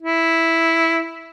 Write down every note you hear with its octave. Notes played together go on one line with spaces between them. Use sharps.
E4